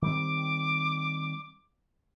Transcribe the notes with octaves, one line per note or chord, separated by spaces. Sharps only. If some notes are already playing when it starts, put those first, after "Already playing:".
D#3 G3 C4 D6